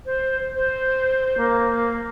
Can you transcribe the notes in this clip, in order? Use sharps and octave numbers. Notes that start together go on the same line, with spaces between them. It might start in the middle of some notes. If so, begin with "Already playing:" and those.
C5
C5
A#3